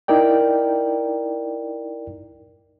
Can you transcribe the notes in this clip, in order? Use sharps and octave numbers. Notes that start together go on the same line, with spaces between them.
D#4 E4 A#4 D5 G5